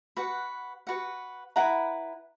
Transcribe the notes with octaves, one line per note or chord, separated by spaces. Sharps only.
F#4 B4 F#5
F#4 B4 F#5
E4 B4 F#5 A#5